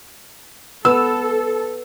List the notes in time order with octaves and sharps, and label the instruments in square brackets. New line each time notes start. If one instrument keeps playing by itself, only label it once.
[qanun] B3 [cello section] A4 [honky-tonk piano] E6